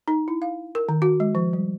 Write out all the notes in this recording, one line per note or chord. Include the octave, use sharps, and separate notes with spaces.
D#4
E4
F5
A#4
D#3
F#4
G#3
F3
G3